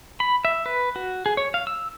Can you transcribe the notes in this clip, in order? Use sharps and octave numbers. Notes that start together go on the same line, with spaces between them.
B5
E5
B4
F#4
G#4
C#5
F5
E6